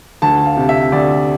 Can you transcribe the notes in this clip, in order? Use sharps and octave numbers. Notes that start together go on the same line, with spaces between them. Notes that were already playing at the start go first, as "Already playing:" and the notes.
D2 A5
F5
C3
E5
D2 D5